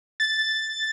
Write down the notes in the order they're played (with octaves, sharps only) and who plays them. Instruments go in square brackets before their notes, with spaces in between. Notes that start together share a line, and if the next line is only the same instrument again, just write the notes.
[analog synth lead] A6